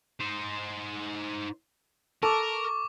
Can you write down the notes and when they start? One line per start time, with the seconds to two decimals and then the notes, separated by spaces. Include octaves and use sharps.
0.20 D#4 C5
2.23 A4 A#4 A5 C#6 D6